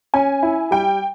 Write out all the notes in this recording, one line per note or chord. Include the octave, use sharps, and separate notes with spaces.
C#4 G#5
E4
G3 G5